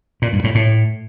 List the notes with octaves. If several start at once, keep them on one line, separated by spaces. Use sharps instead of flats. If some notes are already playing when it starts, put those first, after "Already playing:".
A#2
G2
A2
A2